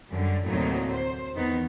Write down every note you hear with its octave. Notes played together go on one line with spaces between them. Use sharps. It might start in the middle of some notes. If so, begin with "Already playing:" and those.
F#2 D3 G3
D2 A2 C3 F#3 A#3 D#4
C5
E2 D#3 B3 D#4